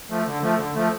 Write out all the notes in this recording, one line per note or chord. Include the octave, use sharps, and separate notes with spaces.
F3 A3
D3
F3 A3
D3
F3 A3